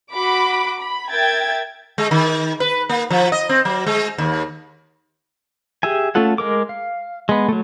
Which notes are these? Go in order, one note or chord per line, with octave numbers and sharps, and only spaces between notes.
F#4 B5 D6
B5
A#4 E5 G5 G#6 A6
G#3
D#3
B4
A#3
F3
D#5
C4
F#3
G#3
D#2
G4 G#4 E5 G#5
A3 C#4 F4 A4 F#5
G#3 A#4 D6
F5
G#3 B3
F#3 A3